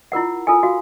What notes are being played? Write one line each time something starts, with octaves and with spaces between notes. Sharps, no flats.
E4 F4 A#4 F#5
F4 A4 A#4 G#5
F#4 F5